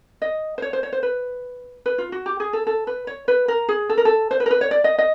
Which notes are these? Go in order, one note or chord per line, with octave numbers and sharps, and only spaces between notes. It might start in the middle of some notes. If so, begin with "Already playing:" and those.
D#5
C5
C#5
C5
C#5
C5
B4
B4
F4
F#4
G4
G#4
A4
A4
B4
C#5
B4
A#4
G#4
A4
A#4
A4
C5
B4
A#4
B4
C#5
D5
D#5
D#5